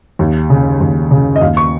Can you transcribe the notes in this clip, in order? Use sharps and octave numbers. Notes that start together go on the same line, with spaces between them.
D#2
C#3
D#2
C#3
D#5
D#2 F5
C#6